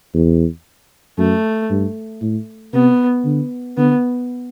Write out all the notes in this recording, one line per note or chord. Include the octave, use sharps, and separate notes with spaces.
E2
F#2 A3
G2
A2
C3 B3
D3
D3 B3